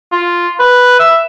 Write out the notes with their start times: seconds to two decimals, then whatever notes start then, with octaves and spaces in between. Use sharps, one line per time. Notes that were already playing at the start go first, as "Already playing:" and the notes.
0.12 F4
0.60 B4
1.00 E5